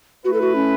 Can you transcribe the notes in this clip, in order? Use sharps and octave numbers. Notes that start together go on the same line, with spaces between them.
A3 E4 F#4 B4
A4
F#4
C#4